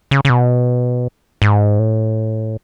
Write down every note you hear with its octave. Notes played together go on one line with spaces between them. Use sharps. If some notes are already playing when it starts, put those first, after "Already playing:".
C#3
C#3
B2
G#2
A2